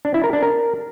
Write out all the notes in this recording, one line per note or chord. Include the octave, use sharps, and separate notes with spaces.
D4
E4
A#4
D4
A#4